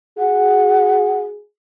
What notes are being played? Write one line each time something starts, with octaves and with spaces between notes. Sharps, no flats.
F#4 G#4 F#5